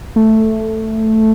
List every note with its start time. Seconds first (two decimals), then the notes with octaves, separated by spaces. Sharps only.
0.16 A3